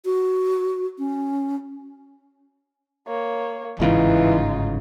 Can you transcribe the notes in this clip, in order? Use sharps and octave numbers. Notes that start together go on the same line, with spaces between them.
F#4
C#4
A#3 C#5
G1 G#2 C#3 E3 D#4 F4